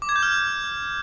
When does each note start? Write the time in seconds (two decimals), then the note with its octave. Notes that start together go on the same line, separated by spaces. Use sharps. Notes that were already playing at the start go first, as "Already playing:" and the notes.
0.02 D6
0.09 G#6
0.16 G6
0.23 F6